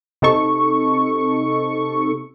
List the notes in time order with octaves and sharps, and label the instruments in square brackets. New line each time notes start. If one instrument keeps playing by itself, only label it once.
[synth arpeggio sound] C3 D#4 A4 C#6